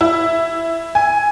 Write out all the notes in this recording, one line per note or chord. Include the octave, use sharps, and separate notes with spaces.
E4
G#5